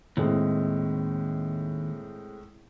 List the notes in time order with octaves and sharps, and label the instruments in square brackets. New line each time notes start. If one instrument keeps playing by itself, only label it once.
[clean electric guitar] D#2 [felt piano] A2 G#3 C4